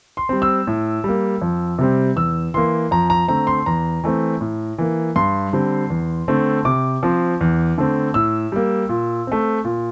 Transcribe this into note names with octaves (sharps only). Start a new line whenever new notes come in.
C6
G3 C4
E6
A2
G3 A#3
F2
C3 G3 C4
E2 E6
E3 A#3 C6
F2 A#5
A#5
D3 A3 C4 A#5
C6
E2 A#5
E3 A3 C4
A2
E3 A#3
G2 C6
D3 G3 C4
E2
D3 A3 C4
C3 D6
F3 C4
E2
D3 A3 C4
A2 E6
G3 A#3
A#2
A3 C4
A#2